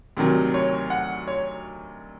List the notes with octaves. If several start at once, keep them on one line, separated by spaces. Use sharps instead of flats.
D2 C3 D#3 F#3
C#5
F#5
C#5